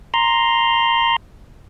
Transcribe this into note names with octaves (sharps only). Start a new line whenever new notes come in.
A#5 C6